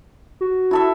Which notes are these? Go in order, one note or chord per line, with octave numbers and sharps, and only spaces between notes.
F#4
E4 A4 E5